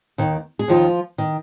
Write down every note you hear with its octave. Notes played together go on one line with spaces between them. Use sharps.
D#2 D#3
G#4
D#2 D#3 F3 F4
D#3